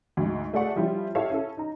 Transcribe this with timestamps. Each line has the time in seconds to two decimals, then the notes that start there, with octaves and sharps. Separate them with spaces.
0.17 D2 G#2
0.53 A3 G#4 D5 F#5 C#6
0.76 F3 G3 C#4 E4 F4
1.15 E4 G4 A4 C#5 E5 F5
1.30 C#4 E4 A4
1.57 D#4 A#5